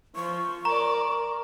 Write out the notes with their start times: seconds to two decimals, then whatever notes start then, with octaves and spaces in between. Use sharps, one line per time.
0.16 F3 C#6
0.65 A#4 D5 A#5
1.09 A#4